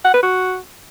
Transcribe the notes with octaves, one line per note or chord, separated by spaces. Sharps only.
F#5
B4
F#4